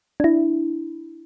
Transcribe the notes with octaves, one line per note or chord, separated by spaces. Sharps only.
D4 E4